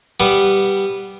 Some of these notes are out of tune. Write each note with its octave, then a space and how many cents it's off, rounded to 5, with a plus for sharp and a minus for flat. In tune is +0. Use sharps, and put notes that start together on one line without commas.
G3 +0 B3 -5